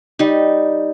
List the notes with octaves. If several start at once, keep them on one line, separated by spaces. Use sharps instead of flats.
G3 D#4